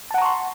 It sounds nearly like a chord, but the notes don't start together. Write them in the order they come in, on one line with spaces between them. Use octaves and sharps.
A5 F#5 A#5 C#6 C6